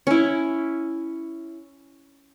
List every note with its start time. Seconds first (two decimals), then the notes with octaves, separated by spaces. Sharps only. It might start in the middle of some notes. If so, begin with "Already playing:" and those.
0.07 C#4 E4